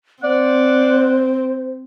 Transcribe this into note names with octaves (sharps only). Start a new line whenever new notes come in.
C4 C5 D5 F#5